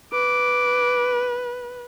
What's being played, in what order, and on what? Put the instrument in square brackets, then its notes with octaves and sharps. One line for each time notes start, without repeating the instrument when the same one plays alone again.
[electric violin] B4 [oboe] D6